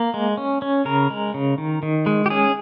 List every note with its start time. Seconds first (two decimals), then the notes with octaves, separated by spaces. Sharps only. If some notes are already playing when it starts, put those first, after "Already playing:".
Already playing: A#3
0.14 G#3
0.37 C#4
0.62 C#4
0.85 C#3 A#4
1.10 G#3
1.34 C#3
1.58 D#3
1.83 D#3
2.06 G#3
2.26 G4
2.30 C#4 G#4